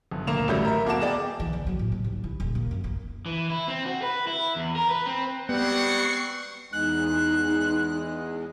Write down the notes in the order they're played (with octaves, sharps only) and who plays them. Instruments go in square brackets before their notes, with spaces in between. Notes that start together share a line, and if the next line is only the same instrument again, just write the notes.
[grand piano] G1
D2 A#3 E7 F7
A1 F#3 G3 A3 E5 G6
A#4 E5
D1 A#3 F#4 A5 D6 E7
B3 G#4 D5 G5
[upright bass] E3
D2
F#3
A2
C3
D#2
E4
D#1
A#3
F#2
A#3
[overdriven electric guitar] E3
E4
C4
F#4
B4
E4
E2
A#4
B4
C4
[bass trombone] G3 [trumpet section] G#3 C4 F#5 [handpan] B3 [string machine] C#6 C7 C#7
[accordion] E2 G#3 [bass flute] D#4 [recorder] F#6